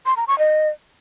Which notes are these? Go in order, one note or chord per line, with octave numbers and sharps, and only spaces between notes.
C6
A#5
C#6
D#5